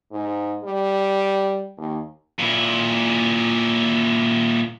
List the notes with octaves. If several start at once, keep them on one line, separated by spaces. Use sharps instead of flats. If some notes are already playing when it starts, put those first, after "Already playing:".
G#2
G3
D#2
A#2 E4